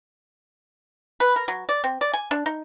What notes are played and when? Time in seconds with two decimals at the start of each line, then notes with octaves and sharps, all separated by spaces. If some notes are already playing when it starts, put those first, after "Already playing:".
1.20 B4
1.36 A#4
1.48 F#3
1.69 D5
1.84 C4
2.01 D5
2.13 G#5
2.31 D4
2.46 D#4